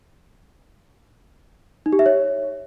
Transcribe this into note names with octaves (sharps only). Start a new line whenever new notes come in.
D#4
G4
E5
C#5